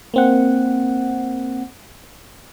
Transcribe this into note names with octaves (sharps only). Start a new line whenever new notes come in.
A#3 C4 F#5